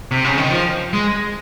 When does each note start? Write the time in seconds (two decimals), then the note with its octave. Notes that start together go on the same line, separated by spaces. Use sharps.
0.12 C3
0.24 C#3
0.37 D#3
0.50 F3
0.93 G#3